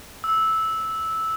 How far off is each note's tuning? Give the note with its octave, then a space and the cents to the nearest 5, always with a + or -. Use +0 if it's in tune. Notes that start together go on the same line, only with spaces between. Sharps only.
E6 -10